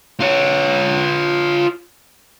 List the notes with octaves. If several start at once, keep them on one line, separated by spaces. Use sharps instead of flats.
F4 C#5